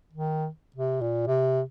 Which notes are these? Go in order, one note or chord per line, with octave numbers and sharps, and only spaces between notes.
D#3
C3
A#2
C3